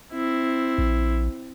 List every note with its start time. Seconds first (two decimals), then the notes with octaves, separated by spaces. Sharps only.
0.13 C4 E4
0.78 A#1